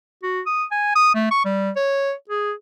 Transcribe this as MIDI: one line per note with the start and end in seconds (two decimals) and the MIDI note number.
0.23 0.41 66
0.46 0.64 87
0.71 0.95 80
0.96 1.13 87
1.15 1.30 57
1.31 1.43 85
1.45 1.70 55
1.76 2.13 73
2.30 2.53 68